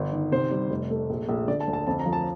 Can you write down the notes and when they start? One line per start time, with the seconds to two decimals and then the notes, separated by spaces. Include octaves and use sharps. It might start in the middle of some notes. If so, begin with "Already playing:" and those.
Already playing: G1
0.12 D#3
0.32 C3 C5
0.51 G3
0.70 F1
0.90 A3
1.10 A#1
1.29 A#1
1.48 D3 D5
1.60 A5
1.67 D2
1.73 A5
1.87 F2 A5
2.00 A#5
2.06 F3
2.13 A5